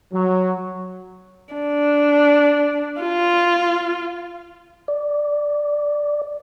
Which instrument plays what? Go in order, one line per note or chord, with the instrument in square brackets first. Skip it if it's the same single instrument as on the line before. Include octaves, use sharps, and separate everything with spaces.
[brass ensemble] F#3
[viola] D4
F4
[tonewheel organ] D5